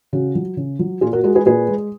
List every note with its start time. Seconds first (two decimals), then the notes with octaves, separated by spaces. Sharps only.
0.13 C#3 F#4
0.35 F#3
0.57 C#3
0.79 F#3
1.01 A#2 F4 G#4
1.13 F#4 A#4
1.24 G#3 F#4 A#4
1.35 G#4 B4
1.46 A#2 G#4 B4
1.68 G#3